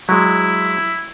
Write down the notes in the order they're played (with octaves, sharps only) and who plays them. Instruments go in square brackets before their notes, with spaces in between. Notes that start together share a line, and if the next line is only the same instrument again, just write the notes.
[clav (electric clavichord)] F#3 G#3 [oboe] E4